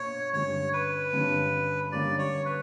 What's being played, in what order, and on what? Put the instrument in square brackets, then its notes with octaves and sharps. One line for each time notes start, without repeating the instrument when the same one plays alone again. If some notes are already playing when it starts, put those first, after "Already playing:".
Already playing: [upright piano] B2 A#3 D4 [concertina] C#5
[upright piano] G2 D3 G3 C#4 [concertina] C#5
[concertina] B4
[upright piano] G2 D3 G3 C#4
[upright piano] D3 G3 A#3 C#4 [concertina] D5
[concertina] C#5
B4